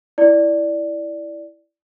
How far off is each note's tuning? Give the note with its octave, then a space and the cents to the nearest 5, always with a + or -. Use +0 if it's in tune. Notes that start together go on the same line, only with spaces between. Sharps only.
E4 +0 D5 +0